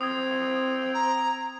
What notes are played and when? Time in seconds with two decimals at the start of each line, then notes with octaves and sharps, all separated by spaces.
0.01 C4 D#6 G#6
0.94 A#5